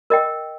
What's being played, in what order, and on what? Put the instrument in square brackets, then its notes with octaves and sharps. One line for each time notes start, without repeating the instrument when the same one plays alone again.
[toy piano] A#4 D#5 G5